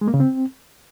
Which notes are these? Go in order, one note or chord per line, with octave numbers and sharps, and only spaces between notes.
G#3
A#3
C#3
C4